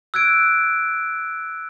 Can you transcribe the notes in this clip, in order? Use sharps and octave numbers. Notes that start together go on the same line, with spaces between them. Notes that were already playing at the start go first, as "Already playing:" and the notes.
E6 F#6 G#6 D7